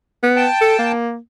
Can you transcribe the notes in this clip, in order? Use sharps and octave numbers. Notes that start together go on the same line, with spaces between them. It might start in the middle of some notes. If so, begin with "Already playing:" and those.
B3
G5 A5
A4
A#3